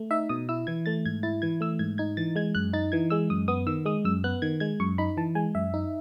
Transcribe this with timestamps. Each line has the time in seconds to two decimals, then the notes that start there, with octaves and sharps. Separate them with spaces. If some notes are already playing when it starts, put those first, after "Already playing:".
Already playing: A3
0.11 D#4 E5
0.29 B2 D#6
0.49 E4 E6
0.67 E3 G#6
0.86 A3 A6
1.05 G#2 G#6
1.23 E4 A6
1.42 E3 G#6
1.61 A3 E6
1.79 G#2 G#6
1.98 D#4 G#6
2.17 E3 A6
2.36 G#3 G#6
2.55 F#2 F#6
2.73 D#4 A6
2.92 E3 G#6
3.10 G#3 E6
3.30 F#2 D#6
3.48 B3 D#6
3.67 D#3 E6
3.85 G#3 D#6
4.04 F#2 E6
4.24 B3 F#6
4.42 D#3 G#6
4.60 G#3 G#6
4.80 F#2 C#6
4.98 D#4 B5
5.17 E3 A5
5.35 G#3 G#5
5.55 F#2 E5
5.74 D#4